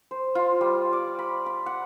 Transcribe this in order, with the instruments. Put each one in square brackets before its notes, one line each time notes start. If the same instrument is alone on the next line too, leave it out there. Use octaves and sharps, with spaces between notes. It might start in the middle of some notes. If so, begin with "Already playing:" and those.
[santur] C5
F4
G3
D5
B5
B5
F#5